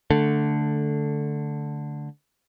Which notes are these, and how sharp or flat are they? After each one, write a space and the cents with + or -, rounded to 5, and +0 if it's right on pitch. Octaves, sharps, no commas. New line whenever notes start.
D3 +0 A3 +0